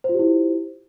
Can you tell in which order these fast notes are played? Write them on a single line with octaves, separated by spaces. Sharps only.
C5 F4 G4 E4